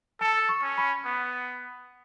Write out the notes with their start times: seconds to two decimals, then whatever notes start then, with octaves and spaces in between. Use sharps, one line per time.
0.21 A4 A5
0.49 C#6
0.63 C#4
0.78 B5
1.05 B3